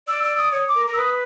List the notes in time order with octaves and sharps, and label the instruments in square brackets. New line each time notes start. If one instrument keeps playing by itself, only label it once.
[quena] D5 [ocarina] E6
[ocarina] E6
D#6
[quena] C#5 [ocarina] D#6
[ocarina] D6
[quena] A#4
A#4
[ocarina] E6
[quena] B4 [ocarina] D#6